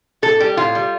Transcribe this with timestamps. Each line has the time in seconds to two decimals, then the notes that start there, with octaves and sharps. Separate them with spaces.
0.22 A2 A4
0.40 G3 G4
0.57 A2 F4
0.75 G3